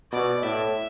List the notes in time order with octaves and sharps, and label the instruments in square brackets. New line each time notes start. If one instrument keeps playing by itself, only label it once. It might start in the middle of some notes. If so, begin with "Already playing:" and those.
[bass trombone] B2 [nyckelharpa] D5
[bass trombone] A2 [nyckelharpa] E5